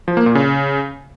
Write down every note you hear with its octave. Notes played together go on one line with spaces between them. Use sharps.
F3
A#3
A#2
C#3